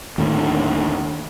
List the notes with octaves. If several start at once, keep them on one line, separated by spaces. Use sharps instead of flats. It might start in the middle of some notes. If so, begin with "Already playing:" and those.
D#2 A2 D3